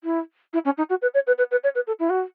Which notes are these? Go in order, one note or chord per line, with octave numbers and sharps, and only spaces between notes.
E4
E4
C#4
D#4
F#4
B4
C#5
B4
B4
B4
C#5
B4
A4
E4
F#4